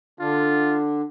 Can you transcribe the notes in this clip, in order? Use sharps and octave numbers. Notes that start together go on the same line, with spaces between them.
D3 D4 F4